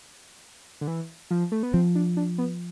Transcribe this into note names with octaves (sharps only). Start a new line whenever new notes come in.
D3
E3
F3
A3
B3
F3 C4
D4
D4
B3